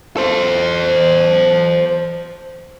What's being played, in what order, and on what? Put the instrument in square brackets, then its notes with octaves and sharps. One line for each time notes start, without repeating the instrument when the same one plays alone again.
[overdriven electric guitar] A4 C5